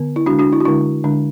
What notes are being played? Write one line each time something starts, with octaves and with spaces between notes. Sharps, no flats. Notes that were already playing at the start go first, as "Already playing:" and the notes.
Already playing: D3 B3
E4
D3 G#3 D4 F#4
D4 F#4
E4
F#4
D3 G#3 D4 E4
D3 G#3 D4